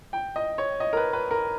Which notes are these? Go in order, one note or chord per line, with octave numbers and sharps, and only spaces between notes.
G5
D#5
C#5
D#5
A#4
B4
B4
A#4